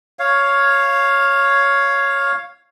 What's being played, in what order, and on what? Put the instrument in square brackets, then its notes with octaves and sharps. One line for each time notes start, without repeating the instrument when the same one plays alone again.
[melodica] C#5 F5